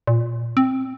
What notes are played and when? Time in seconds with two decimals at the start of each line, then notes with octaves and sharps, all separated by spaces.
0.07 A#2
0.57 C4